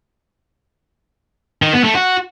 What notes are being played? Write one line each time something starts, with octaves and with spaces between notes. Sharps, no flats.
D#3
B3
A3
F#4